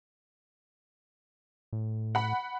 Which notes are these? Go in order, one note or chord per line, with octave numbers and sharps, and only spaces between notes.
A2
F#5 B5